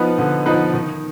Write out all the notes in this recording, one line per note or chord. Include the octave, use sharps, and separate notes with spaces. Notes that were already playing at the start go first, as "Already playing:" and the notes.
Already playing: F3 B3 D#4 B4
D3
F3 B3 D#4 B4
D#3